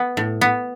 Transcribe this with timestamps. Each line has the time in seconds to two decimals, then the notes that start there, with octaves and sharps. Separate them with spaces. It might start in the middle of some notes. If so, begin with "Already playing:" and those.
Already playing: B3
0.17 A2
0.41 B3